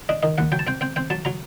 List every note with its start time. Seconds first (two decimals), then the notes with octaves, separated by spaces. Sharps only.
0.09 D4 D#5
0.23 D#3 D#5
0.38 D#2 F#5
0.52 F#3 G5
0.59 A5
0.67 C4 G5
0.81 C4 G5
0.96 C4 G5
1.10 F#3 A5
1.25 F#3 A#5